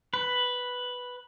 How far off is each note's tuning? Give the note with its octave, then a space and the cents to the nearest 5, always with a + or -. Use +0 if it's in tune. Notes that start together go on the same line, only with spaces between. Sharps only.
B4 +0